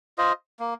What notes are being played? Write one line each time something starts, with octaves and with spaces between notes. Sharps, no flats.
F4 C5 D#5
A#3